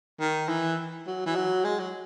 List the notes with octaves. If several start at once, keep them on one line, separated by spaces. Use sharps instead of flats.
D#3
E3
F#3
E3
F#3
G#3
F#3